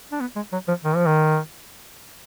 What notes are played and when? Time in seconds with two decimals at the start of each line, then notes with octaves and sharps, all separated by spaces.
0.12 D4
0.21 B3
0.36 G#3
0.52 F#3
0.68 F3
0.85 D#3
0.96 F3
1.06 D#3